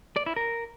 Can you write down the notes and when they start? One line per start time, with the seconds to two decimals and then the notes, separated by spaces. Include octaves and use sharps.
0.16 D5
0.26 E4
0.36 A#4